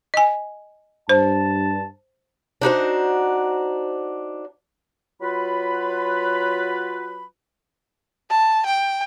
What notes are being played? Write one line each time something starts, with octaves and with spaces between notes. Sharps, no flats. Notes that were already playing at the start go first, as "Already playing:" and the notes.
D#5 G#5
G2 C5 A5
D4 D#4 F#4 C5
F#3 F4 B4 B5
A5
G5